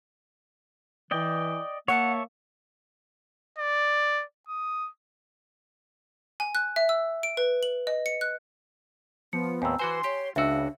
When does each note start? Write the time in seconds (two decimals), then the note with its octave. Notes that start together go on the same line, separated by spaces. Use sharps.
1.11 E3 D5 D#5 G5
1.88 A#3 C#5 E5 F#5 A5
3.58 D5
4.49 D#6
6.40 G#5
6.55 F#6
6.76 E5
6.89 E6
7.23 D7
7.37 B4
7.63 F#7
7.87 D#5
8.06 C#7
8.21 F#6
9.33 F3 B3 C#7
9.62 D#2 A2 C4 G#5 A#5 E6
9.79 E3 F#4 B4 C5 G#5 C6
10.04 G4 C#5
10.36 C#2 C#3 D4 F#4 E5 E6